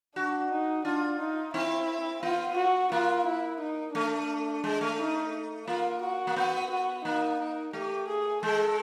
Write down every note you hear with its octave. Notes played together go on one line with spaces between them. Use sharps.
D4 F#4
D#4
D4 F4
D#4
C4 E4
B3 F4
F#4
A#3 F4
E4
D#4
A3 D4
G#3
A3
D#4
A#3 F4
F#4
A#3
B3
F#4
A#3 D#4
D#4
A3 G4
G#4
G#3 A4